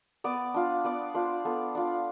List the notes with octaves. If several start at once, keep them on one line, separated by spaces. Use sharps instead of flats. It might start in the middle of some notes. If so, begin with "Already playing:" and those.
B3 D5
D4 F4
B3 D5
D4 F4 C5
B3 A4
D4 F4